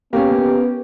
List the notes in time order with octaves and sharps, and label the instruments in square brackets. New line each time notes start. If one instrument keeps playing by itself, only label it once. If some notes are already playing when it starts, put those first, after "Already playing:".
[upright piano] A#3 C#4 [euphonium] B3 [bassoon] G4